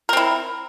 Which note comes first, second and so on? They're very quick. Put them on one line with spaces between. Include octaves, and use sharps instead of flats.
A#4 C4 E4